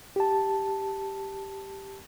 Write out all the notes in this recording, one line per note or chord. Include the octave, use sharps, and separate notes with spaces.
G4 A5